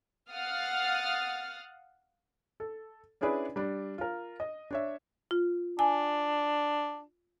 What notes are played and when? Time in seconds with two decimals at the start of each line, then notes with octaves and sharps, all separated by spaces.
0.31 F5 F#5 D#6 F6 A6
2.60 A4
3.21 C#4 D4 E4 G#4 B4 D5
3.56 G3 D4
3.98 F4 A#4
4.40 D#5
4.71 D4 C#5 E5
5.31 F4
5.79 D4 G#5